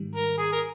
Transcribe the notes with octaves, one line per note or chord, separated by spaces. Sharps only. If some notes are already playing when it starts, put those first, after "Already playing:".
Already playing: G#2 D#3 G3
A#4
G#4
A#4